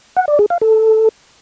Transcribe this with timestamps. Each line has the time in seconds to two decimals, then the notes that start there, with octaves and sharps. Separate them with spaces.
0.17 F#5
0.28 D5
0.39 G#4
0.50 F5
0.61 A4